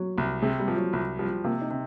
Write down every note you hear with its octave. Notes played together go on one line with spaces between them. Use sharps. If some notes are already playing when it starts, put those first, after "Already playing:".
Already playing: F#3
C2
C3 G#3
G3
F3
F#3
C2
F3 G3
C3 A#3
D#4
C3